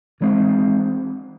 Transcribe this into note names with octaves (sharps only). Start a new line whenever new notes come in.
E3 G#3 C4